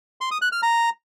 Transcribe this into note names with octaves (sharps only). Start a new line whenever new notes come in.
C6
D#6
F#6
F6
A#5